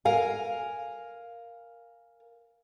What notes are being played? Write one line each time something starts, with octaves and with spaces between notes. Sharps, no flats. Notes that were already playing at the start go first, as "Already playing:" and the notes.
A#4 F5 G#5